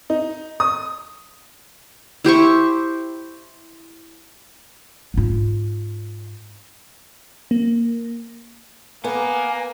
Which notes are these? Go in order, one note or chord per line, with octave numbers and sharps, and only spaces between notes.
D#4
D#6
E4 G4 C5 C#6
G#2 F4
A#3
A#3 B3 G#5